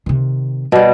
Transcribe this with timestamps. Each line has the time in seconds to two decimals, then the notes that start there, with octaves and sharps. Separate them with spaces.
0.06 C3 D#3
0.72 B2 G3